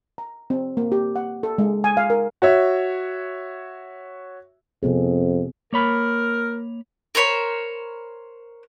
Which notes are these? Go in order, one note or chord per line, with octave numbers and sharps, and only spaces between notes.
A#5
C4
A#3
G4
F#5
A4
G#3
G#5
F5
A#4
F#4 C#5 E5
F2 C3 B3 G#4
A#3 A#4 C#5 B5
A#4 C5 C#5 B5